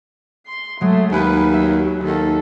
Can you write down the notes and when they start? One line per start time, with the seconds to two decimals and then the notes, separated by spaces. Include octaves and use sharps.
0.47 C6
0.81 F#3 G#3 A3
1.12 D#2 B4 G#5
1.54 F#3 E5
2.03 D#2 A4